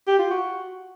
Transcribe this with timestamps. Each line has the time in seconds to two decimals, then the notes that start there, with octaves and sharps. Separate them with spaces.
0.07 G4
0.19 F4
0.30 F#4